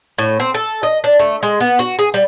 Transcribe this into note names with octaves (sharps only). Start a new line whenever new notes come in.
A2
C4
A4
D#5
D4
A3
G#3
B3
F#4
G#4
G3